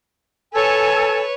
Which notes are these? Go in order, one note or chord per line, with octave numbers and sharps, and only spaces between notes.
A4 B4 C#5 G#5